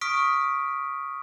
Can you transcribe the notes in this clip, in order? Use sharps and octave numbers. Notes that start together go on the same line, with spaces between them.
C#6 D#6 F6 B6 D7